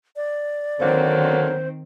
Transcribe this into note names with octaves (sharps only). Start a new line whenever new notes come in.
D5
D3 D#3 F#3 A#3 C4 C5